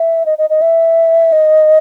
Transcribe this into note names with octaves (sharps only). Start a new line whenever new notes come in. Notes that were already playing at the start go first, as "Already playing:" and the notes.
Already playing: E5
D#5
D#5
D#5
E5
D#5